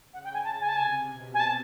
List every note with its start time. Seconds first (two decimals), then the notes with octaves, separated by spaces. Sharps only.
0.13 C#3 F#5
0.24 G5
0.34 G#5
0.44 A5
0.61 G#5
0.68 A5
0.76 C3 G#5
1.09 B2
1.34 G#5
1.40 A5